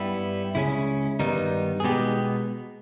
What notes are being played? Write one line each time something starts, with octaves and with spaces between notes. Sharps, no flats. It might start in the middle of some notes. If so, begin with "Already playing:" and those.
Already playing: G2 G3 B3 E4
C#2 C#3 G#3 C#4 E4
G2 D#3 G3 B3 D#4
G#4
B2 G#3 B3 D#4 G4